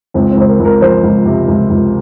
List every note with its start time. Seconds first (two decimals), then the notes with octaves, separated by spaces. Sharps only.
0.14 C#2 C4
0.31 C4
0.37 C#2 C5
0.48 A#4
0.59 C#2
0.65 A#4
0.81 F3 C5
1.04 C#2
1.26 C3
1.48 C#2
1.70 C#2